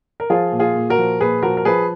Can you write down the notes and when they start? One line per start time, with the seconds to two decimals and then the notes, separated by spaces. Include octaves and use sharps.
0.20 A#4
0.30 F3 F4 G#4
0.52 A#2
0.59 F4 G#4
0.75 A#2
0.90 F#4 A#4
0.98 F3
1.21 A#2 G#4 B4
1.43 F3 F#4 A#4
1.57 A#4
1.65 F3 G#4 B4